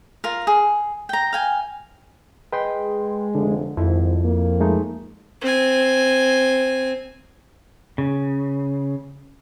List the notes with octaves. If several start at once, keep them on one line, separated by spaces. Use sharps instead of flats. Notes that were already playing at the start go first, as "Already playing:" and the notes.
F4 A#4
G#4
G5 A#5
F5 G5 G#5
G#3 B4 G5 C6
F1 D3
G#1 F2 E4
A#3
G#3 A3 D#4
C4 G#5
C#3